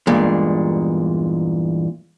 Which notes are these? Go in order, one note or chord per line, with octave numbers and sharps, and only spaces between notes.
E2 G2 A#2 G#3